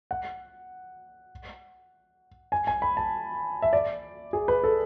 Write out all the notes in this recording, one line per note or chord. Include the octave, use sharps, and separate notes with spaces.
F#5
G#5
G#5
B5
A5
E5
D5
G#4
B4
A4